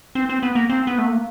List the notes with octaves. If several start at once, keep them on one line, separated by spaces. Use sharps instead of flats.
C4
C4
B3
A#3
C4
B3
A3
A#3